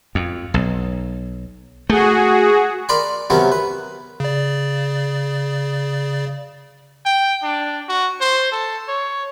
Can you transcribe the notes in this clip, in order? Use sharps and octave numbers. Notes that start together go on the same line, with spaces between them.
F2
B1
A3 F#4 G#4
A#4 D5 B5 C6
C3 F#3 B3 C#4 A#4
B4
C#3 D5
G5
D4
F#4
C5
A4
C#5